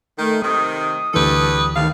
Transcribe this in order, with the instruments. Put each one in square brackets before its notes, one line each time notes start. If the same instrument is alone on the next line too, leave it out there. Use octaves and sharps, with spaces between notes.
[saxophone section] D#3 [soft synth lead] A3
[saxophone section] C3 D#3 [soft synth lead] D#6
[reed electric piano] D2 E3 [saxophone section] G2 A4 B4
[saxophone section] A2 C3 F5 [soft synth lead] D#3